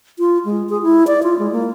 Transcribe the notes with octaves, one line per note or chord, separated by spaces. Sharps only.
F4
G#3
G#4
E4
D5
F4
G#3
A#3